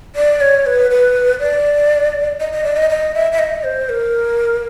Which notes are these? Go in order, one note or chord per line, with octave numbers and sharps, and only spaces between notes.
D5
C#5
B4
B4
D5
D#5
D#5
D5
D#5
D#5
E5
E5
D#5
C5
A#4